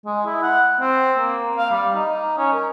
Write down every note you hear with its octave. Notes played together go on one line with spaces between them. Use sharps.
G#3
E4
F#5
C4
A#3
F5
G3
D#4
C#4
A#4